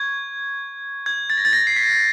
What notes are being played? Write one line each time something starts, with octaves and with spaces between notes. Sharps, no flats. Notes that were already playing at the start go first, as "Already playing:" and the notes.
Already playing: C#6 G#6
G#6
A6
A#6
A6
A#6
C7
B6